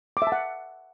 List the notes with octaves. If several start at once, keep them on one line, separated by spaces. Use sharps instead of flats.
D6
E5
A5
F#5